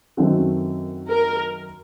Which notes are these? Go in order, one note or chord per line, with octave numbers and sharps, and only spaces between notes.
F#2 D#3 A3 C4 F#4
A#4